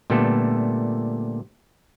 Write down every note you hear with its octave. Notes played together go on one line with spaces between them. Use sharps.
A#2 D3 G3 A3 B3 A4